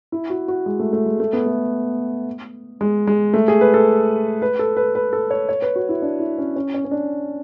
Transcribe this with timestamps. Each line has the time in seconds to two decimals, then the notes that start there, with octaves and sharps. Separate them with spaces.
0.12 E4
0.30 F#4
0.48 F#4
0.66 G#3
0.80 A3
0.93 A3
1.06 G#3
1.20 A3
1.33 B3
1.46 A3
2.81 G#3
3.07 G#3
3.34 A3
3.48 G#4
3.61 B4
3.74 A4
4.42 B4
4.59 A4
4.77 B4
4.95 B4
5.13 A4
5.30 C#5
5.49 C#5
5.62 B4
5.76 F#4
5.89 E4
6.02 D4
6.20 E4
6.38 C#4
6.56 C#4
6.74 C#4
6.85 C#4
6.91 D4